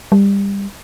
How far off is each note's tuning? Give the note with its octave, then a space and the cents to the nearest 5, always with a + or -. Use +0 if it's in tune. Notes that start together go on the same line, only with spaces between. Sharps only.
G3 +25